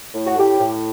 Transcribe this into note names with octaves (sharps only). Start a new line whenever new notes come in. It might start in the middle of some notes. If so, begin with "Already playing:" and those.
A2
F#4
A2 G4
A2